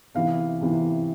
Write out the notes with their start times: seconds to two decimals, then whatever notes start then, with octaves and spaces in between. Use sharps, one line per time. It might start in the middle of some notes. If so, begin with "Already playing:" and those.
0.15 E2 C3 E3 F5
0.61 E2 C3 E3